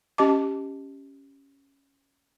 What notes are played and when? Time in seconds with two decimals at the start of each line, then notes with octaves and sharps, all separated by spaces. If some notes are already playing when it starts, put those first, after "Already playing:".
0.18 C#4 G4 D#5 A5 D6